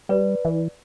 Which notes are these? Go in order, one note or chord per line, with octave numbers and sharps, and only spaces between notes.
G3 B4 D5
E3